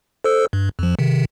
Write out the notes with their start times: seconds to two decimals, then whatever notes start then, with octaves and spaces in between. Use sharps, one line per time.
0.24 A4 C5 E6
0.53 G2
0.79 F2 F3
0.99 C3 D#3